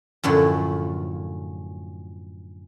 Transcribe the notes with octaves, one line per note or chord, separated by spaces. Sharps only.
F#2 A2 D3 F3